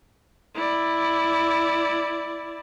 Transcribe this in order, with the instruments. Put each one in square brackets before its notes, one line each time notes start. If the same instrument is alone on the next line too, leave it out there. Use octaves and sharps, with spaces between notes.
[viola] E4 D5